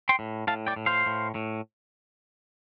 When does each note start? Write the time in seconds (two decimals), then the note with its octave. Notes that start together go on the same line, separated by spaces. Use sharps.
0.09 G5 C6
0.19 A2
0.47 A2 F5 A5
0.67 D5 G5
0.76 A2
0.86 C5 F5
1.06 A2
1.35 A2